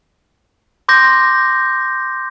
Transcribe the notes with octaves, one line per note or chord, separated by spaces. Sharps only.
C6 D6 G6 A#6